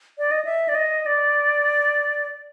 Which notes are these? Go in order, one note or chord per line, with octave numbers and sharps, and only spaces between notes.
D5
D#5
E5
D5
D#5
D5